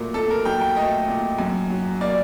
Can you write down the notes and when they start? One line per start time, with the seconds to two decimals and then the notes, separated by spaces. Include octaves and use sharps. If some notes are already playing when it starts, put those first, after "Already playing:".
Already playing: A#2 F#3 A3 A#4
0.14 A#2 A4
0.30 A#4
0.45 F#3 G5
0.61 G5
0.76 A3 D#5
1.08 A#2
1.39 F#2
1.70 F#3
2.01 A#3 D5